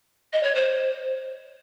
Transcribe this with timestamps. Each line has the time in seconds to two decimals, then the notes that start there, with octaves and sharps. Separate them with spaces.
0.33 D#5
0.43 C#5
0.54 C5